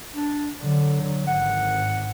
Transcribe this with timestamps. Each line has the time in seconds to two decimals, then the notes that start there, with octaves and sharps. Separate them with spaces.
0.14 D4
0.61 D3 F#3
1.27 G#1 F#5